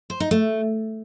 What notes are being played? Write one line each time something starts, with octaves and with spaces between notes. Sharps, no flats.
C5
D#4
A3